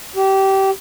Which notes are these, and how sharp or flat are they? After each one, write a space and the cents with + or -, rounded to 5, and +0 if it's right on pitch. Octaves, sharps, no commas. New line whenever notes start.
G4 -20